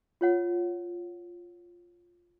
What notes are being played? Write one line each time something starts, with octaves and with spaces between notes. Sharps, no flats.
F4 C#5 F#5